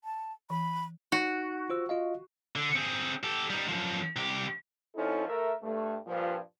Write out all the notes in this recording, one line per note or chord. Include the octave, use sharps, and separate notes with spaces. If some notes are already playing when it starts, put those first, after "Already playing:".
A5
E3 B5
D#4 F#4 F#5
F4 C5 E6
F4 D#5 F5
D3
C4 G#4
G4 A4
G3 D#4
F#2 F3
C2 G4
F3 C4 C#4 D#4 E4 A4
A3 A#4 E5
G2 A3
G2 A#2 F3